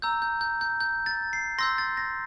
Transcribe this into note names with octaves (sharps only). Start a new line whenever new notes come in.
A#5 E6 G6
G6
G6
G6
G6
A6
C7
C6 E6 G6 A#6
A6
A#6